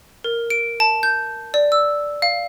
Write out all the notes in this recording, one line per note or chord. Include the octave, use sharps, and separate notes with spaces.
A#4
D7
A5
G6
D5
E6
F5